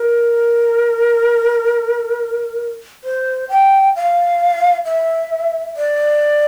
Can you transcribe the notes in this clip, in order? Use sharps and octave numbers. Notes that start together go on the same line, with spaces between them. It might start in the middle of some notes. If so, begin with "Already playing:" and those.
Already playing: A#4
C5
G5
F5
E5
D5